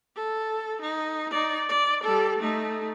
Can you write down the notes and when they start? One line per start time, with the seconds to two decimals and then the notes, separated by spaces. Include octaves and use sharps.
0.16 A4
0.81 D#4
1.31 D#4 D5
1.69 D5
2.03 G3 A4
2.39 A3 D#4